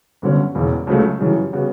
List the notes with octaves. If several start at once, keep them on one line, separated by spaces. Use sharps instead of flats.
G1 G2 D3 F#3 C#4
E1 E2 C#3
C#2 C#3 F#3 A3
F#2 C#3 E3 G3
C#3 G3 B3 F#4